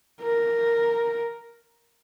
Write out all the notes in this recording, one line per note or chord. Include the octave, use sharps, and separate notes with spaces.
A#4